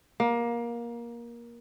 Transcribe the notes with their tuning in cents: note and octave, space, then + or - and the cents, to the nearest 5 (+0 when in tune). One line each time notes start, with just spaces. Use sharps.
A#3 +20